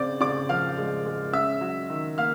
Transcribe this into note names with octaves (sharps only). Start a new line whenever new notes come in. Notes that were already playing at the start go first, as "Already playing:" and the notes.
Already playing: C#3 C4 D5 D6
C#3 D5 D6
F3 F5 F6
G#3
G#3
C#4 E5 E6
F#3
D#3
A#3 F5 F6